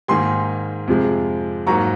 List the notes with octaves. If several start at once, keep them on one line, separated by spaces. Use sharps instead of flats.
G#2 D#3 A#3 G#5 C6
F2 C3 F3 G#3
G#2 F#3 A#3 A#5 C#6